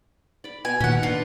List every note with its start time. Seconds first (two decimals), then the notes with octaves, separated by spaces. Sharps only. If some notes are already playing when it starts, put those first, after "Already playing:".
0.44 D5 B5
0.65 B2 G#5
0.80 A#2 D#3 C#4 F#5
1.03 D4 F4 F#4 B4